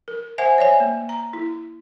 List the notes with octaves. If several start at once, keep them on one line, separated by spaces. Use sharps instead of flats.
A#4
C5 E5 F#5 G#5
C#5 D5 E5 G#5
A#3
A#5
E4